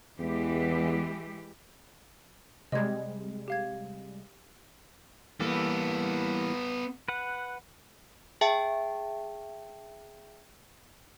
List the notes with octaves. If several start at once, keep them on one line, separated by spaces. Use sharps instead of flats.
E2 E3 G#3 G4
C3 G3 G#3 D#5 G#6
G4 F5 G#6
E3 G3 A#3 B3 A4
B4 F#5
G#4 E5 G5 A5